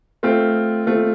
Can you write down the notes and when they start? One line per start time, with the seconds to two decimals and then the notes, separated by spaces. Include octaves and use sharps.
0.23 A3 C4 F4
0.86 A3 C4 F4